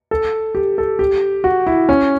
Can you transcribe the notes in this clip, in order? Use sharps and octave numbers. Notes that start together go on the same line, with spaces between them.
A4
G4
A4
G4
F#4
E4
C#4